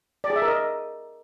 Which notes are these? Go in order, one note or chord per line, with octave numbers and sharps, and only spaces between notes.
D5
G#4
E5
A#4
D#5